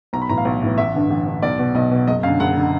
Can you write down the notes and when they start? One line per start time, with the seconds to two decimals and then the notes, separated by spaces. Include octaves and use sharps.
0.13 B1 A#5
0.22 B5
0.29 A2 E3 A#5
0.38 F5
0.45 B1
0.62 A2 E3
0.78 A1 E5
0.94 G2 D3
1.10 A1
1.26 G2 D3
1.42 B1 D5
1.59 B2
1.75 B1 D#5
1.91 B2
2.07 F#1 D#5
2.23 F#2 F5
2.28 D3
2.40 F#1 F#5
2.56 D3